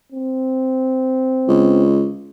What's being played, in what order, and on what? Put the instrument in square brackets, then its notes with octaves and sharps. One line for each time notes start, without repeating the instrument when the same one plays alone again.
[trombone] C4
[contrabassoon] C#2